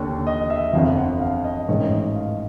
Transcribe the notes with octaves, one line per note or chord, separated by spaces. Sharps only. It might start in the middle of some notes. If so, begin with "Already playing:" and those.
Already playing: D#2 D3 C#5
D#5
E5
G1 F2 D3 F5
F#5
F5
D#5
A1 G#2 D#3 C#5
D#5
F5